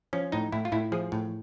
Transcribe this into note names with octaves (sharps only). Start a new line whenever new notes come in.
F3 C#4
A2 D#4
A2 E4
F4
A2 E4
F3 G#4
A2